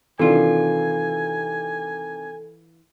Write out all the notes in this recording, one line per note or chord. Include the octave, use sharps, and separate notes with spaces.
C3 D#3 E3 D4 F4 A4 G#5